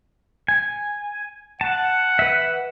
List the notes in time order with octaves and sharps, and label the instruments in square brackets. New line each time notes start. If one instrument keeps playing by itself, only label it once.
[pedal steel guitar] G#5
[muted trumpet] F#5 [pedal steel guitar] A5
[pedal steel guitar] B4 E5